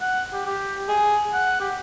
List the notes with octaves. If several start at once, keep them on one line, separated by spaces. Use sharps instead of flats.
F#5
G4
G4
G#4
F#5
G4